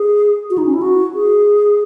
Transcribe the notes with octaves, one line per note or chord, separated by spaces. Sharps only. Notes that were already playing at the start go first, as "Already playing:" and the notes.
Already playing: G#4
F#4
D#4
C#4
E4
F#4
G#4